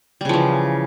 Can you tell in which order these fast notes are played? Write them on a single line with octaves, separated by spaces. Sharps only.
G3 C#3 F3 E3